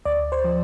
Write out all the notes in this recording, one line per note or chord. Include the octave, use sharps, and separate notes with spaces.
D2 D5
C5
F3